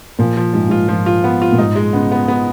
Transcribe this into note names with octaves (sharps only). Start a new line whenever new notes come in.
A#2 F3
F3
G#2 F3
G#2 F4
G#2 F3
F4
B3
F4
A#2
G#2 D#4
G#3
C#3 B3
B3
B3